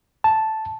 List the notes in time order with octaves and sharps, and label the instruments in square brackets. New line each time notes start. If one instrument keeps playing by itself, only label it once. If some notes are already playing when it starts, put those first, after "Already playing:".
[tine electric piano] A5